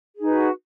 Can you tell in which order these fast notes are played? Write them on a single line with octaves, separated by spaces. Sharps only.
G#4 D#4 B4 F#4